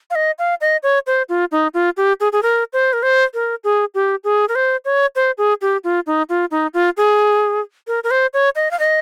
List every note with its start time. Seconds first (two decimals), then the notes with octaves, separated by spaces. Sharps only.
0.10 F5
0.15 D#5
0.39 F5
0.61 D#5
0.83 C#5
1.07 C5
1.29 F4
1.52 D#4
1.74 F4
1.97 G4
2.20 G#4
2.33 G#4
2.43 A#4
2.73 C5
2.93 A#4
3.03 C5
3.34 A#4
3.64 G#4
3.94 G4
4.24 G#4
4.49 A#4
4.55 C5
4.85 C#5
5.16 C5
5.38 G#4
5.61 G4
5.84 F4
6.07 D#4
6.29 F4
6.51 D#4
6.74 F4
6.97 G#4
7.87 A#4
8.04 A#4
8.11 C5
8.34 C#5
8.56 D#5
8.71 F5
8.79 D#5